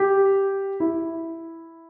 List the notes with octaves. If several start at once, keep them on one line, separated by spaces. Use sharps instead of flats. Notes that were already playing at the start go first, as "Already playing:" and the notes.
Already playing: G4
E4